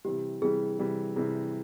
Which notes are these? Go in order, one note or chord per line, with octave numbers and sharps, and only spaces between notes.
C3 E3 G3 G4
C3 E3 G3 G#4
C3 E3 G3
C3 E3 G3 G#4